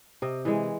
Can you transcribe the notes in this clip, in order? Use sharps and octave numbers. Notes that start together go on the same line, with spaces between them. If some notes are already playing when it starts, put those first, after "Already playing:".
C3 D#5
E3 G#3 D#5